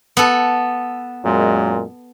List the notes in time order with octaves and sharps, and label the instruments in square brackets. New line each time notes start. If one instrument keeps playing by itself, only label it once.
[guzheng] B3 A4
[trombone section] F#2 A#2 G#3